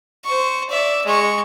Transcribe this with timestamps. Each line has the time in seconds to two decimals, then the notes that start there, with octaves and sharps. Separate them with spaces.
0.25 C5 C#6
0.70 D5 E5
1.06 G#3 C#6